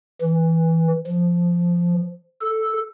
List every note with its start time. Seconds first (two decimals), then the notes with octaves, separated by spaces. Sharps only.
0.21 E3
1.07 F3
2.42 A4